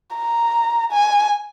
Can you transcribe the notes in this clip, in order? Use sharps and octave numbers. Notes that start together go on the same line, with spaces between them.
A#5
G#5